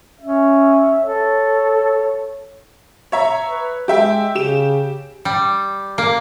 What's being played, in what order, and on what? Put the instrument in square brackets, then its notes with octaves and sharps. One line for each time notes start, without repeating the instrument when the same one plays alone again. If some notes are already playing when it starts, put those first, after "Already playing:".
[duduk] C#4 [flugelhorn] E5
[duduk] A4 [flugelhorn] C#5
[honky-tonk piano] C#5 E5 A#5
[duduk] B4
[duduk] G#3 [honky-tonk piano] G4 E5 G5
[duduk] C#3 [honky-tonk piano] G4 E7
[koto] G3
A#3